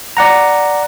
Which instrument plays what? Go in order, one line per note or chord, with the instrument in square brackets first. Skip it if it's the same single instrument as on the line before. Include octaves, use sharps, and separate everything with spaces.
[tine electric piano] D5 F#5 A#5